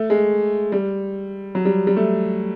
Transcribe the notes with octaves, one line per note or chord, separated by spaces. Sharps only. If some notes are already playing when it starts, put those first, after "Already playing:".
Already playing: A3
G#3
G3
F#3
G3
G3
A3